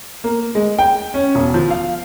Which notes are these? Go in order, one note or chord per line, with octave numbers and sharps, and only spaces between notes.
A#3
G#3
G5
C#4
E1
F3
F5